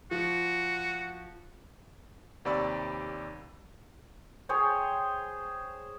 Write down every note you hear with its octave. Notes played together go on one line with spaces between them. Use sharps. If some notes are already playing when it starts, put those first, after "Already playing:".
F3 F#4
D#2 C3 D5 B5 C#6 E6
G#4 C5 C#5 G5